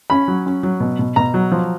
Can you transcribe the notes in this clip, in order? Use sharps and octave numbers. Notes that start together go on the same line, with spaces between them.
C#4 B5
F#3
C#4
F#3
B2
B2
B2 A#5
F#3
F3